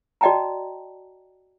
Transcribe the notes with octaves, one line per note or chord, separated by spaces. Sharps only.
F#4 D5 D#5 G5 A5 A#5